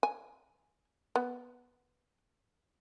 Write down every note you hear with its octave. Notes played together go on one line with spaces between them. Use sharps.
G#5
B3